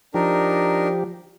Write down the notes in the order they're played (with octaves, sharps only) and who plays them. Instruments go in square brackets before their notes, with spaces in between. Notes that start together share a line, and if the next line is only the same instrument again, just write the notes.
[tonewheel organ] F3 G4 [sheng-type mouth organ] D4 D#4 A#4